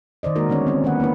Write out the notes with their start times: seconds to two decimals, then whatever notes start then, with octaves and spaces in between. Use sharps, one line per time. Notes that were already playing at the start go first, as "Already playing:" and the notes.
0.23 D#3 C5 D5 D#5
0.36 G#3 A#3 D#4 F#4 A#4
0.49 D3 G3 B3 C#4 C#5 D5
0.67 C4 C#4
0.84 D#3 A#3 A#4 B4 F#5
1.00 A#3 B3 D#4 B4